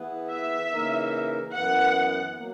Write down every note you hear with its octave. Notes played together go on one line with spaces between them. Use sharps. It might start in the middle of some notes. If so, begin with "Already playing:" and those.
Already playing: E3 B3 E4 G#4 B4
E5
C#3 E3 A#3 D#4 A#4
F#2 E3 B3 F#5
F#3 A#3